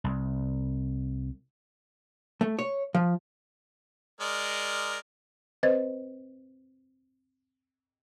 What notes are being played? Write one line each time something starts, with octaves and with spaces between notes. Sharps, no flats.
C2
A3
C#5
F3
G#3 A#4 D5
C4 B4 C5 D#5 G#6 A6